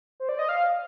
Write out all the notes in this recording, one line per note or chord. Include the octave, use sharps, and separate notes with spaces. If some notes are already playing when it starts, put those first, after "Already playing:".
C5
D5
D#5
F5